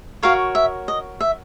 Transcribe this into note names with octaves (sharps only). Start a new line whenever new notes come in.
F#4 A#4 C#5 F5
E5
D#5
E5